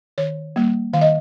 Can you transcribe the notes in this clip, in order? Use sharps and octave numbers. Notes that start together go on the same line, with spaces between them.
D#3 C#5
G3 A#3
D#3 F5
D#5